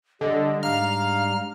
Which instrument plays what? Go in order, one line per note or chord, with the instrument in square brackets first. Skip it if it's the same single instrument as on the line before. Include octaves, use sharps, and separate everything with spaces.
[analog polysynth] D3 [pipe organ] G3 [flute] D#5
[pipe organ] G#2 G3 D4 [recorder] F5 [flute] A#5 [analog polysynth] F6